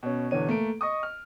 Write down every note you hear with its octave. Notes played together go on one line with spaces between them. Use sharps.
B2 C#4
E2 B2 D3 C#5 D#7
A3 A#3 D7
D#5 C#6 D#6
F6